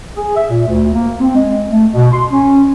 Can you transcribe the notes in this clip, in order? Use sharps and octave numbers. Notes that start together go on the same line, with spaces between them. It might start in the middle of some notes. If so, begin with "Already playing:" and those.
G#4
E5
A#2
D2
A#3
C4
G#3
A3
B2
C6
C#4